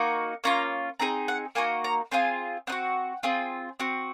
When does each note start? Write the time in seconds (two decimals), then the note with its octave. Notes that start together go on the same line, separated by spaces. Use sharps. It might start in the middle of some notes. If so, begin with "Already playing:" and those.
Already playing: A#3 D#4 F#4
0.44 A#3 C#4 F4 A#5
1.00 C4 D#4 G#4 A#5
1.28 F#5
1.55 A#3 D#4 F#4 G#5
1.84 A#5
2.12 C4 F4 G#4 G#5
2.67 C4 D#4 F#5
2.72 F#4
3.23 C4 F4 G#4
3.80 C4 F#4